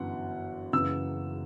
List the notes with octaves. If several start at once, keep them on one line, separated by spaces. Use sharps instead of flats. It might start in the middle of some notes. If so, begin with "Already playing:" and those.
Already playing: G1 F#2 E3 F#5
F#1 F#2 C#3 E3 E6